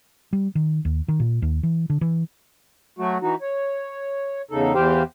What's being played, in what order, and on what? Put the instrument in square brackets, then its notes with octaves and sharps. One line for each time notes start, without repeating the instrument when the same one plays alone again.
[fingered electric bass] G3
D#3
D#2
D#3
A#2
D#2
E3
D3
E3
[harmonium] F#3 A3 F#4
E3 D#4 F#4
C#5
E2 C#3 D#4 A4
E2 E3 G4 C5 F5 G5